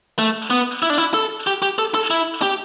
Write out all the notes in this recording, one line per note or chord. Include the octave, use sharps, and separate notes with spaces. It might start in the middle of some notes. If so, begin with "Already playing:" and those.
A3
B3
E4
D4
E4
A4
G4
G4
A4
A4
E4
G4